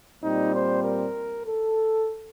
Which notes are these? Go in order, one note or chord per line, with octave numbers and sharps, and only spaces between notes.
A#2 G3 C4 D#4
C5
A#4
A4